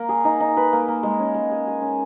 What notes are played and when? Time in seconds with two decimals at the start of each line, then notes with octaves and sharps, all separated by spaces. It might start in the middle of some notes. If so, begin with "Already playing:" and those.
Already playing: A#3
0.09 G#4
0.25 D#4
0.40 D#4
0.57 B4
0.73 A#3
0.88 A#3
1.03 G#3
1.20 C#4
1.34 G#3
1.51 G#4
1.67 G#4
1.82 C#4